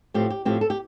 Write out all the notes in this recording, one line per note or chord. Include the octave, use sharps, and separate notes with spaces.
A2 F3 C4 G4
G4
A2 F3 C4 G4
A4
G4